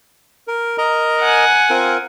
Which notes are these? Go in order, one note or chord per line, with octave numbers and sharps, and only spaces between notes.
A#4
A#4 D#5 A#5
F#5 G#5
C4 F4 A#4